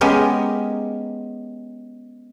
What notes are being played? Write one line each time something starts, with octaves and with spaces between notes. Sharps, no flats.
G#3 B3 C#4 G4 A#4